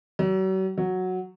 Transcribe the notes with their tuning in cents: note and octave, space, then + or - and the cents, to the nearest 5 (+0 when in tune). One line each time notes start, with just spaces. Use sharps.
F#3 +40
F#3 -5